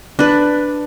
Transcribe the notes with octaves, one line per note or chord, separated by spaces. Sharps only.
D4 B4